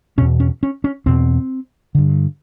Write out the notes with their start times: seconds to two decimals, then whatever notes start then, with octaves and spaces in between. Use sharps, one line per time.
0.18 E2 B2 C#4
0.40 C#4
0.63 C#4
0.84 C#4
1.06 E2 B2 C4
1.95 G2 D3